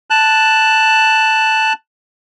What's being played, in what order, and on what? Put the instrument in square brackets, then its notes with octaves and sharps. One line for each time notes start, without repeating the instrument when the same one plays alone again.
[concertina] A5 F#6